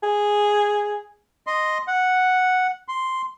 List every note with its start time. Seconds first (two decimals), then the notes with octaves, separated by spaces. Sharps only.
0.03 G#4
1.47 D#5 C6
1.87 F#5
2.88 C6